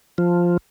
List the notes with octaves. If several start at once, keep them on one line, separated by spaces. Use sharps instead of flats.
F3